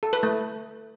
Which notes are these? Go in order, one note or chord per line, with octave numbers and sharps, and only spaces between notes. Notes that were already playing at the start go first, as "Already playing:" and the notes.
A4
B4
A3